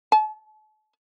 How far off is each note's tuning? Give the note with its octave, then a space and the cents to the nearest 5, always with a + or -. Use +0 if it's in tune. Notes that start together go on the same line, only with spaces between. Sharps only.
A5 -40